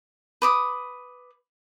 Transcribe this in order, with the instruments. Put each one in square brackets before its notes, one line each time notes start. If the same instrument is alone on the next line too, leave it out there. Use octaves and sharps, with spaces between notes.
[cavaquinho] B4 D6 D#6